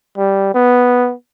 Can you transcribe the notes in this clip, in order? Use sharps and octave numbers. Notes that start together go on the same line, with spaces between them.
G3
B3